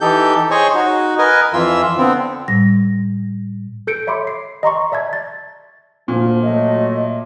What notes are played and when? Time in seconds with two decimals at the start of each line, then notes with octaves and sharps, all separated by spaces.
0.01 E3 D#4 G4 A4 G6
0.51 G#4 C5 C#5 D#5 G#5 C#6
0.75 D#4 F#4
1.18 A#4 B4 D#5 G#5
1.53 F2 E3 F4 E5 E6
1.98 D3 B3 C4
2.48 A2 G3 A#6
3.87 A4 G6 C#7 D7
4.07 C#5 E5 B5 C6 D6
4.27 C7
4.63 D#5 A#5 C6 C#6
4.92 D5 E5 A5 G#6
5.13 A6
6.08 D2 A#2 F3
6.43 F#3 A3 D#5